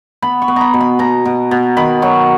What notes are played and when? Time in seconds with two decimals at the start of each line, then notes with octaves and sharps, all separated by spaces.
0.22 B3 B5
0.42 C#6
0.48 B3
0.56 A#5 B5
0.74 B2
0.81 B5
0.99 B2 A#5
1.25 B2
1.51 B2
1.77 D#3 B5
2.02 F#3 C#6